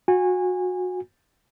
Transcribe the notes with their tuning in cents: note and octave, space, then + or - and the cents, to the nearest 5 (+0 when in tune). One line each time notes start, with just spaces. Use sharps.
F#4 -25 G#5 -25